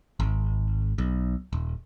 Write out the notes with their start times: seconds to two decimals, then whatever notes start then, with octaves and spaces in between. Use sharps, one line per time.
0.20 G#1
0.98 B1
1.53 D#1